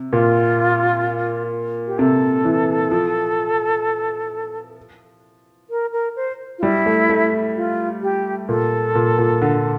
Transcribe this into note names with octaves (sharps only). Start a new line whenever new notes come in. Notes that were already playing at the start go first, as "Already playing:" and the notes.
Already playing: C3
A#2 F4
G4
C3 A4
E3
F3
A#4
A#4
C5
F4
G3 E4
A3
A3
F4
G4
A#2 A4
A#2
A#2
D3